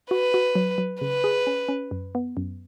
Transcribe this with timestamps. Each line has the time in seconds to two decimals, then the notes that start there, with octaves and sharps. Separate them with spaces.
0.11 F#4 B4
0.34 F#4
0.55 F#3
0.78 F#3
1.01 C#3 B4
1.24 G#4
1.47 C#4
1.69 C#4
1.91 F#2
2.15 B3
2.37 F#2